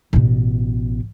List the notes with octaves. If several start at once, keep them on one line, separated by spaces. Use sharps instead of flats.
A1 B2